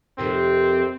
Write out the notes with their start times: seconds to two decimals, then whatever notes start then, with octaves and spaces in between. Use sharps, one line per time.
0.18 F2 C3 D#3 C4